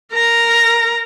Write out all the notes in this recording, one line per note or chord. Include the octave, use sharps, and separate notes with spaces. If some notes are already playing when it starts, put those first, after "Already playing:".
A#4 A#5